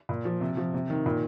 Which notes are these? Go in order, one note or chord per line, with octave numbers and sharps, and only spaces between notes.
A#2
F3
C3
F3
C3
D#3
A#2